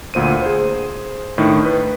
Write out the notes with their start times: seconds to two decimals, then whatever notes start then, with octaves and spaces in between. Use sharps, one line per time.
0.14 D2 A#2 C5 D#7
0.42 G#4 C5
1.38 A2 D#3 D4
1.65 B4